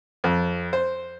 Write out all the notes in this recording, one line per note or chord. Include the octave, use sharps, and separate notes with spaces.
F2
C5